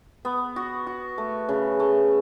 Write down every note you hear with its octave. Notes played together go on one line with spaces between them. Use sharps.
B3
F#4
F#4
A3
C#3
A3